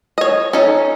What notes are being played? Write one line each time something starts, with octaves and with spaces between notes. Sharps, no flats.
C#5 D#5
C#4 D#4 A4